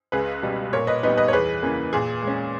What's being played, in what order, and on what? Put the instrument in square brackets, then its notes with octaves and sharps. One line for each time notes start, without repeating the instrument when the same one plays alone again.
[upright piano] C#2 G#4 B4
B2 G3
A#2 A#4 C#5
B4 D#5
G3 B3 D#4 B4 D#5
B4 D#5
C#5
E2 G#4 B4
C#3 E3 A#3
A#2 G#4
G#3 C#4